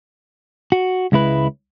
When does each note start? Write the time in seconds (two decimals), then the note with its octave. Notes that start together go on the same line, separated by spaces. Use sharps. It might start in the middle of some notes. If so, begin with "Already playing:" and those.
0.72 F#4
1.12 C#2 G#3 E4 B4